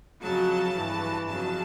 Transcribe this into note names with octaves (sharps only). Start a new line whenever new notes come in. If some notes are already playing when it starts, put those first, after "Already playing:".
F2 C#3 F#3 A5
G2 E3
F2 C#3 F#3 A5